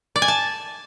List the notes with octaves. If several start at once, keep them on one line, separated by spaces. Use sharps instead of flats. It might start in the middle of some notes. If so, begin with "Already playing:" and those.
D5
G#5
A5